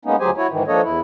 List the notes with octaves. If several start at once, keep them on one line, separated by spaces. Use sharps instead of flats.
G#3 A#3 B3 C#4 D#4
D2 F#3 G4 G#4 C5 G#5
E4 F#4 C#5
G#2 D#3 E3
F3 A#3 D4 A4 C#5 D#5
E2 E4